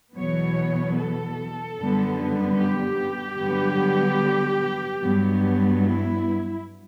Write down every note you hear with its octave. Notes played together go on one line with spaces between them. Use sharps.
E2 B2 F#3 B3 C#5
A4
F#2 D3 G3 B3
G4
G2 D3 F#3 B3
G2 F#3 B3
E4